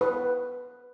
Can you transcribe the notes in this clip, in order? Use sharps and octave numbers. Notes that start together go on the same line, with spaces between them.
B4